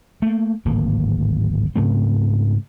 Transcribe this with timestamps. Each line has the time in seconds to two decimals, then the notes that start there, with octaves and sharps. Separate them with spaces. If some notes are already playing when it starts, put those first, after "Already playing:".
0.22 A3 A#3
0.65 D1 G#1 A#3
1.76 G#2 C#3 A3 C4